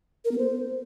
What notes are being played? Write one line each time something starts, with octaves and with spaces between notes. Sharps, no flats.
A#4
B3
C5